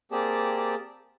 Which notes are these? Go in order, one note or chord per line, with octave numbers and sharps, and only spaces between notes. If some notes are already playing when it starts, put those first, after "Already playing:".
A#3 C4 G4 G#4 D5 A5